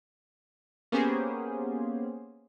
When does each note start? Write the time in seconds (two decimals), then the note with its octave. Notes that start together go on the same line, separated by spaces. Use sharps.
0.92 A#3 B3 C#4 G4 G#4 C5